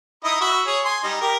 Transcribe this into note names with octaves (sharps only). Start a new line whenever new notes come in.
D#4 E4 D#6
F#4 E5 B5
G#4 C#5
G#5 C6
G3 D#4
G4 A#4